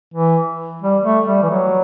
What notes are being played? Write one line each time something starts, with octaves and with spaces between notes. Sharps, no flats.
E3
G3
A3
G3
E3
F#3